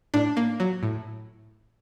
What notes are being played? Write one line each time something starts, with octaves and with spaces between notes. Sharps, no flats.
A2 D4
A#3
F#3
A2